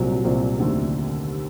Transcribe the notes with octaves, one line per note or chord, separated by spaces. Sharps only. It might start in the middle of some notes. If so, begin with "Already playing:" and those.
Already playing: C2 A#2 F#3 C4
C2 A#2 F#3 C4
D#2 D3 A3 C4